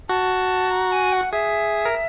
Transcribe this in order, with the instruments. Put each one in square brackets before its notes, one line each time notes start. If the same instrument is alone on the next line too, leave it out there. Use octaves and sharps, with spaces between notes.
[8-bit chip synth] F#4 [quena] A5
[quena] A#5
G#5
F#5
[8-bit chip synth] G#4 [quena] E5
[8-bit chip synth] A#4